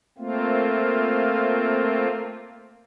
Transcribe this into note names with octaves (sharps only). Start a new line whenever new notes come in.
A3 A#3 C4 F4